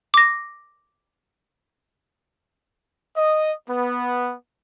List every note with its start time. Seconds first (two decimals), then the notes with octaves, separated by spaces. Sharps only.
0.14 D6 A#6
3.17 D#5
3.69 B3